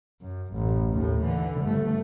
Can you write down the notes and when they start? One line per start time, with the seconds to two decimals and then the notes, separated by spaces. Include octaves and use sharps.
0.21 F#2
0.53 A1
0.94 D#2 A2
1.22 D3 E3
1.61 G1 A3